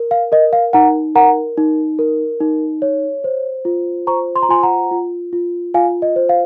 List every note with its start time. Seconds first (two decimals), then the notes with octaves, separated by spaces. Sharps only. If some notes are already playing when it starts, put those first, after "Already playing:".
Already playing: A#4
0.11 F5
0.32 A#4 D#5
0.53 F5
0.73 D#4 F#5 A#5
1.15 A#4 F#5 A#5
1.58 D#4
1.99 A#4
2.40 D#4
2.82 C#5
3.24 C5
3.65 F4
4.07 C5 A#5 C#6
4.36 C6
4.42 A#5
4.49 F4 G#5 C6
4.63 F#5 A#5
4.91 F4
5.33 F4
5.74 F4 F5 G#5
6.02 D#5
6.16 C5
6.29 F5